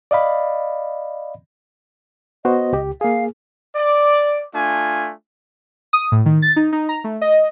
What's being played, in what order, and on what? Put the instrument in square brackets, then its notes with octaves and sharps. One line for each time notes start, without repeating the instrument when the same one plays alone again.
[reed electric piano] D5 D#5 F5 B5
[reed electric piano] B3 F#4 C5 [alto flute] D#5
[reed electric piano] C#2 G4
[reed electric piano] A#3 G#4 [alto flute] F5
[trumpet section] D5
A3 D4 F4 G#5
[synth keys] D#6
A2
D#3
A6
D#4
D#4
A#5
A3
D#5